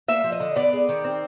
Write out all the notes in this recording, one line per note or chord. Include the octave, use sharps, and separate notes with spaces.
A#3 E5
F3
D#5
D3
B3 D5
G#3
D#3
C4